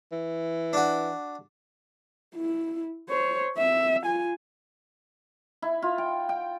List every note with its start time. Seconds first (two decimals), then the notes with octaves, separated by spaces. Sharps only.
0.12 E3
0.73 D4 F#4
2.36 E4
3.09 C5 C#5
3.57 C4 E5
4.02 F4 G#5
5.62 E4
5.82 F4
5.98 G5
6.29 G5